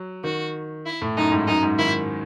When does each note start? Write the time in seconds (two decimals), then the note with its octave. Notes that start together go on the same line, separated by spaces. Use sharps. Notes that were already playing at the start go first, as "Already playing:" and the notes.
Already playing: F#3
0.24 D#3 F#4
0.86 E4
1.02 A2
1.17 F#2 D#4
1.32 G#2
1.47 F#2 D#4
1.63 G#2
1.78 D#3 E4